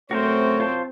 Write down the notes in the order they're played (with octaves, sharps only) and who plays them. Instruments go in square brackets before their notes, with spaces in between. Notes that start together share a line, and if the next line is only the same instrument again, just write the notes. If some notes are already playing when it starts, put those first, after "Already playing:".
[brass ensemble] F#2 C3 C#5 [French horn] A3 [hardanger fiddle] C4 [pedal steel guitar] F#4 A#4 C5
[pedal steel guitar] F4 C5 A5